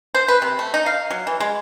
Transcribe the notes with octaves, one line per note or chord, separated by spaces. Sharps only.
C5
B4
C3
A3
D#4
F5
F#3
E3
G#3